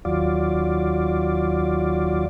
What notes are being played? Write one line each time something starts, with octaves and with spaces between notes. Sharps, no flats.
D#2 F#3 F4 D5